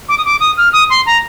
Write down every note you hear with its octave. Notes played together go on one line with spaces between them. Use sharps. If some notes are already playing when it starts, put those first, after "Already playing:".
D6
D#6
D6
D#6
F6
D#6
C6
A#5